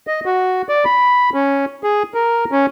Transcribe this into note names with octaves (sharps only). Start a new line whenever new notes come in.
D#5
F#4
D5
B5
C#4
G#4
A#4
C#4